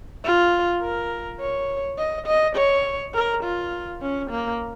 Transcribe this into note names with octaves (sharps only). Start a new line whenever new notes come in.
F4
A#4
C#5
D#5
D#5
C#5
A#4
F4
C#4
A#3